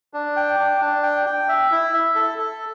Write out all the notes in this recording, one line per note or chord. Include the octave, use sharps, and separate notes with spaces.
D4
G5
D4
D4
G5
G5
E5
E4
E5
A4
A4